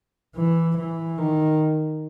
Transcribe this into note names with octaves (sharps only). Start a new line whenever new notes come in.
E3
E3
D#3